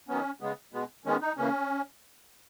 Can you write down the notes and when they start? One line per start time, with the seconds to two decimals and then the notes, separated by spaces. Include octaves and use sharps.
0.09 D#3 F#3 B3 C#4
0.40 C#3 G#3 B3
0.73 B2 G#3 B3
1.05 D#3 G#3 B3 C#4
1.21 D#4
1.37 C#3 E3 A#3 C#4